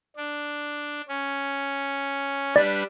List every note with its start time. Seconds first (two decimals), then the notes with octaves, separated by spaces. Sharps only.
0.16 D4
1.08 C#4
2.56 G3 D4 B4 D5